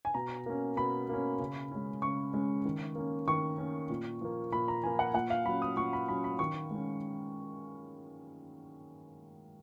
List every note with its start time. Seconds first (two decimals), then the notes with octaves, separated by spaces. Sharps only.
0.05 G#5
0.14 B2 A#5
0.46 A#3 C#4
0.77 B2 B5
1.09 A#3 C#4
1.39 C#3
1.71 G#3 C#4
2.02 C#3 C#6
2.33 G#3 C#4
2.65 D#3
2.95 A#3 C#4
3.28 D#3 C#6
3.58 A#3 C#4
3.90 A#2
4.21 F3 A#3
4.52 A#2 B5
4.68 A#5
4.83 F3 A#3 G#5
4.99 F#5
5.14 A#2 F#5
5.30 F5
5.45 F#3 C#4 B5
5.62 D#6
5.76 A#2 C#6
5.93 B5
6.08 F#3 C#4 B5
6.24 B5
6.39 D#3 C#6
6.71 G#3 C#4